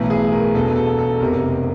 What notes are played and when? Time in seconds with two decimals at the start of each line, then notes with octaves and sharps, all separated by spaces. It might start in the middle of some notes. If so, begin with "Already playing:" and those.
Already playing: B1 A2 E3
0.10 G#4
0.32 A#4
0.54 E1 E2 B2 A4
0.76 A4
0.99 A4
1.20 F1 E2 C3 A#4